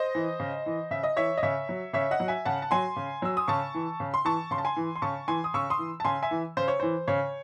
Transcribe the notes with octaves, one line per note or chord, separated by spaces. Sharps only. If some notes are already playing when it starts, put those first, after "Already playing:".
Already playing: C5 D#5
E3
C#3
E3
C#3 E5
D#5
E3 C#5 E5
D#5
C#3 C#5 E5
F#3
C#3 C#5 E5
D#5 F#5
F#3
E5 G#5
C#3 F#5 A5
A5
F#3 G#5 C6
C#3
F#3 E6
D#6
C#3 A5 C#6
E3
C#3
C6
E3 A5 C#6
C#3 C6
A5
G#5 C6
E3
C6
C#3 A5 C#6
E3 G#5 C6
D#6
C#3 C#6 E6
C6 D#6
E3
A5
C#3 G#5 C6
E5 G#5
E3
C#3 C5
C#5
E3 C5
C#3 C#5